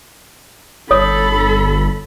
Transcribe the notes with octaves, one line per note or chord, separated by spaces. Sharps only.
G1 A4 C#5 B5 D#6